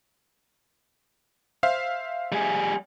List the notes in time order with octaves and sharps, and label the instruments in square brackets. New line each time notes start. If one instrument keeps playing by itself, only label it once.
[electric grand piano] C5 E5 F5
[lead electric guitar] G3 G#4